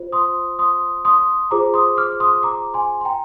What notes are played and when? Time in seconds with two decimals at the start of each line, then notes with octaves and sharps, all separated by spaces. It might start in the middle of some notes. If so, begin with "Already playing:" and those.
Already playing: F4 C5
0.12 C6 D#6
0.59 C6 D#6
1.05 C6 D#6
1.51 F4 G#4 C5 A#5 D6
1.74 C6 D#6
1.97 D6 F6
2.20 C6 D#6
2.43 A#5 D6
2.74 G#5 C6
3.01 C6
3.05 G5 A#5